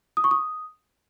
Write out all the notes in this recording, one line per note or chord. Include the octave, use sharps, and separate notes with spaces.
D#6
C#6
D#6